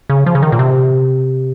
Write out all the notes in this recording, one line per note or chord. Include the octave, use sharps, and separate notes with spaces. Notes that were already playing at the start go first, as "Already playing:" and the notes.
C#3
F3
C#3
D#3
A#2
C3